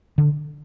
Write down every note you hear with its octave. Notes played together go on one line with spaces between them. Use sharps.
D3